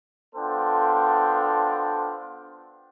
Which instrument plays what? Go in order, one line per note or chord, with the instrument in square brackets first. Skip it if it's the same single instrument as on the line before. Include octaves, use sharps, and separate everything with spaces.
[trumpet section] B3 D4 F4 A4 C5 G5